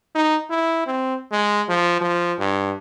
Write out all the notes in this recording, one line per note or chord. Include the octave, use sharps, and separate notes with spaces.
D#4
E4
C4
G#3
F3
F3
G2